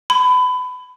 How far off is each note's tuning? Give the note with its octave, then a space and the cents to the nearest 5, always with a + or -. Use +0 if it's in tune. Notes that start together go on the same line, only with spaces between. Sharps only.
B5 +25